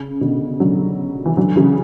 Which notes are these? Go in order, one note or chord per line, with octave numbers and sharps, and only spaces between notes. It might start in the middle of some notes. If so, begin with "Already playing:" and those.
Already playing: C#3
B2 D3
D3 F#3
E3
D3 F#3
C#3 E3